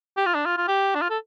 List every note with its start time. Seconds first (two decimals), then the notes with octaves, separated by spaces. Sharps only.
0.17 G4
0.26 F4
0.35 D4
0.46 F4
0.57 F4
0.68 G4
0.95 D4
1.02 F4
1.10 A4